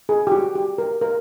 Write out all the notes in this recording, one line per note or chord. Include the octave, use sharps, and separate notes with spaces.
G#4
G4
F#4
G4
A#4
A#4